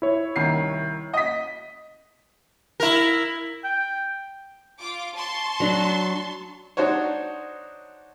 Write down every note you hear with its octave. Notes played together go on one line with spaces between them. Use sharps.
E4 C#5
C2 D#3 C7
D#5 B6
E4 A#4
G5
F4 D6
A5 C6 C#6
F#3 D4
D4 D#4 F#4 C5 C#5